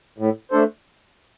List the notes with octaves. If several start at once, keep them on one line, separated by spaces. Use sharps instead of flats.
A2
A3 D4 A4 C5